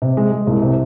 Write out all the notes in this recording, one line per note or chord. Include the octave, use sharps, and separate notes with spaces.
C3
G#3
G#3
C2
C3